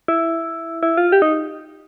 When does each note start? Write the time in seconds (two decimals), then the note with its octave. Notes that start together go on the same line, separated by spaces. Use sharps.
0.08 E4
0.83 E4
0.97 F4
1.12 G4
1.22 D#4